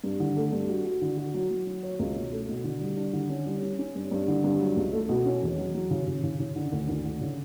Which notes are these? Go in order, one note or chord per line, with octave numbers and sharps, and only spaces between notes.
G2
D3
A3
G2
F#4
F#4
D3
F#4
F#3
F#3
F#3
C#5
C#2
B2
A3
B2
D3
G3
D4
D3
C#4
G3
C#4
C#4
G2
G2
D3
G2
F#3
C#2
A3
B2
C#4
E2
F#3
F#3
C#3
C#3
C#3
C#3
D3
D2
D2
D3
C#3